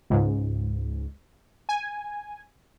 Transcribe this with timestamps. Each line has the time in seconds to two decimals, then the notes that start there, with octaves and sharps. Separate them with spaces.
0.10 C#2 G#2
1.69 G#5